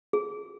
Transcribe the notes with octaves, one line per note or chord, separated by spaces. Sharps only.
G#4